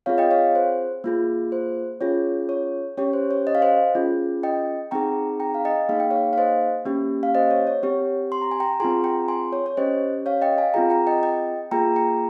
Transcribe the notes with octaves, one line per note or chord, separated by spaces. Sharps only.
C4 F4 G#4 C#5 F5
D#5 G5
C#5 F5
C5
A#3 F4 G#4
C5
C#4 F4 G#4 C#5
C#5
C#4 G4 C#5
C5
C#5
D#5
F5
C5 D#5
C#4 F4 G#4
D#5 G5
C4 D#4 G#4 G5 A#5
G5 A#5
F5
D#5 G5
A#3 D#4 G#4 F5
G5
C#5 F5
F5
C5 D#5
A#3 C#4 G4
F5
C5 D#5
C#5
C#5
C4 G4 C#5
C6
A#5
G#5
G5 A#5
C4 F4 G#4 G#5 C6
G5 A#5
G#5 C6
C#5
C#5
C#4 G4 C5 D#5
C#5 F5
D#5 G5
F5 G#5
C4 F4 G#4 G5 A#5
G5 A#5
D#5 G5
D#5 G5
A#3 F4 G#4 G5 A#5
G5 A#5